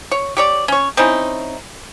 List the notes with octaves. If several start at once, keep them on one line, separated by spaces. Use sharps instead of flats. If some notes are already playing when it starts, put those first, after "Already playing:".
C#5
G4 C#5 D5
C#4 C#5
C4 C#4 D#4 E4